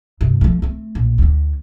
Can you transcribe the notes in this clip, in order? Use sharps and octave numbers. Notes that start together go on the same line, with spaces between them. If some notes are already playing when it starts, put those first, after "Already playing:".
G2 C3
F3 A3
A3 C4
A#1
D2 D3